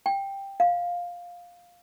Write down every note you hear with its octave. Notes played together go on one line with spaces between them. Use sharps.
G5
F5